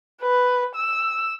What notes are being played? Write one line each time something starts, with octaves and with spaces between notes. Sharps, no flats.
B4
E6